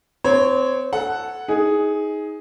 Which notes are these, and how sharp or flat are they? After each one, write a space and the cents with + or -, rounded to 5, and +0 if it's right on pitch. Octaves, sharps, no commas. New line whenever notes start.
C4 -20 C#5 +0
A4 +0 F#5 +0
D#4 +20 G#4 +0